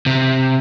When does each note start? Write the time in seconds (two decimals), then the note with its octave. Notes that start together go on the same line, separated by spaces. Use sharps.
0.06 C3